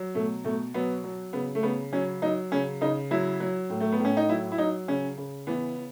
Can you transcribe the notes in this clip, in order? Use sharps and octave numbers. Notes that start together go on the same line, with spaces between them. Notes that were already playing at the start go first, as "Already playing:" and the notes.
Already playing: F#3
B2 A3
B2 A3
F#3 B3
F#3
C#3 B3
A3
C#3 B3
F#3 C#4
F#3 D#4
C#3 C#4
C#3 D#4
F#3 E4
F#3
A2
A3
B3
A2
C#4
D#4
F#3 E4
E4
F#3 D#4
C#3 C#4
C#3
E3 B3